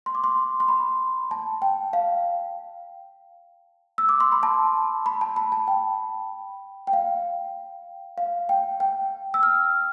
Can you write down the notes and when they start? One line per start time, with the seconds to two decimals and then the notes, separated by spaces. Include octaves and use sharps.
0.06 C6
0.15 D6
0.24 C6
0.60 C6
0.68 B5
1.31 A5
1.62 G5
1.93 F5
3.98 E6
4.09 D6
4.20 C6
4.32 B5
4.43 A5
5.06 B5
5.21 A5
5.36 B5
5.52 A5
5.68 G5
6.87 G5
6.93 F5
8.18 F5
8.49 G5
8.80 G5
9.34 E6
9.43 F6